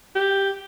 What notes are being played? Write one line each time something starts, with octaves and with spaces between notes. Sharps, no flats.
G4